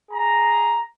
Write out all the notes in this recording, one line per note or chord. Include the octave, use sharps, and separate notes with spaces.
G#4 A#5